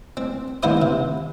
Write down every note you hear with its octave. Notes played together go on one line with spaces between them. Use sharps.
C4
D#2 B3 E4 C5 D#6
C3